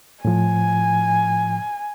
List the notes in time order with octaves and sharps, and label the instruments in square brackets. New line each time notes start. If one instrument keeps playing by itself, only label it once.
[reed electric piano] A2 F3 [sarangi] G#5